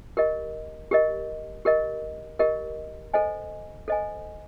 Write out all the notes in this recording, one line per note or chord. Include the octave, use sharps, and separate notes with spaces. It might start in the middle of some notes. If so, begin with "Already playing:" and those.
G4 A#4 D#5
G4 A#4 D#5
G4 A#4 D#5
G4 A#4 D#5
A4 C5 D#5 G#5
A4 C5 D#5 G#5